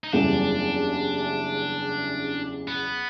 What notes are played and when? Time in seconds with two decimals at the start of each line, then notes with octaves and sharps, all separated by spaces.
0.04 D#4
0.12 F#1 E2 C#3 E3 G3 D4
2.68 B3